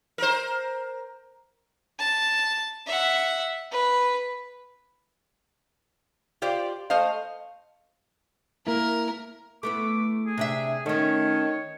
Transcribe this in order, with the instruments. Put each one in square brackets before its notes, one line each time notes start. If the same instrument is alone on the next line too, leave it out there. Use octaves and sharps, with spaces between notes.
[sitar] A#4 C5
[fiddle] A5
E5 F#5
B4
[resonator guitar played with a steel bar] F4 G4 C5 D5
A3 C5 D#5 F5
[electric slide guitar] A#3 E4 [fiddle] A#4
[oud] A3 B3 E4 [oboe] D6
[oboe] G#4
[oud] C3 D4 E5
[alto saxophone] D#3 [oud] A3 C#4 [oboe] C#5